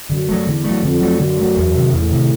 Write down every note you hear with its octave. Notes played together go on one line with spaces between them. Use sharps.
F#2 D3
F#3 A3
E2 D3
F#3 A3
F2 D3
F#3 A3
F#2 D3
F#3 A3
E2
C3 D#3
E2 A2
C3 D#3